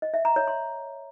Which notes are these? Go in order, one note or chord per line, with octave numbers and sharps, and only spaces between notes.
D#5
E5
A#5
C#5
C6